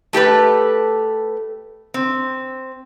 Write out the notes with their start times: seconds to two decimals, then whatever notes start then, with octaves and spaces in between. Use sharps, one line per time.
0.13 A3 G4 A4 B4
1.94 C4